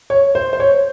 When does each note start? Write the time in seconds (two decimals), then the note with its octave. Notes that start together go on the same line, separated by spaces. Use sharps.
0.10 C#5
0.35 C5
0.53 C5
0.60 C#5